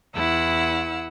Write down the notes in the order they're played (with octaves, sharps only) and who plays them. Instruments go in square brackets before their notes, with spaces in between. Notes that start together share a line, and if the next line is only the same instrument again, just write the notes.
[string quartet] E2 E4 F#5 E6